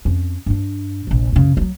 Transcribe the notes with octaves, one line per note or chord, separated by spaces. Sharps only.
F2 C#4
G2 D4
F1 A#1
F#2 C#3
D#3 F#3